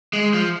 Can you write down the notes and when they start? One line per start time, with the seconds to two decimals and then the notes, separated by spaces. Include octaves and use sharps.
0.13 G#3
0.34 F3